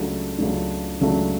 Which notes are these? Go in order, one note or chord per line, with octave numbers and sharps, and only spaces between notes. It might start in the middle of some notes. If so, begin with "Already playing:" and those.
Already playing: C#2 C#3 F#3 A3 D4
C#2 C#3 F#3 A3 D4
C#2 C#3 F#3 A3 D4